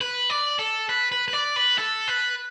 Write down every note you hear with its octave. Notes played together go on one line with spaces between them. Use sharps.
B4
D5
A4
B4
B4
B4
D5
B4
A4
B4